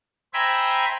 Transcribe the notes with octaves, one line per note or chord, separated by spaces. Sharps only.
C5 E5 G5 G#5 A#5 B5